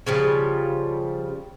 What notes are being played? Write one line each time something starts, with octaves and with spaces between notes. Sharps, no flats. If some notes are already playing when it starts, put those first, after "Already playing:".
C#3 F3 G3